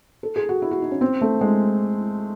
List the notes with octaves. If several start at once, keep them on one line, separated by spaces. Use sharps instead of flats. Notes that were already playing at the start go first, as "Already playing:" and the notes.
A4
G#4
F#4
E4
F#4
D#4
C#4
C4
A3
G#3